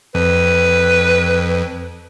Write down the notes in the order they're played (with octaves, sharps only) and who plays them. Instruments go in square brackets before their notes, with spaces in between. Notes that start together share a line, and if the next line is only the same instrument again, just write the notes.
[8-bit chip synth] F2 [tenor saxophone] B4